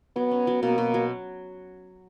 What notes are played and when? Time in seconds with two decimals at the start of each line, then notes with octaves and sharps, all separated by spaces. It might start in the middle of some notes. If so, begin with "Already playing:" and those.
0.16 F#3 B3
0.31 C#4
0.47 F#3
0.63 B2 A#3
0.78 B2
0.94 F#3